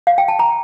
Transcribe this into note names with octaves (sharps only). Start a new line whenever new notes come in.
F5
G5
A5
A#5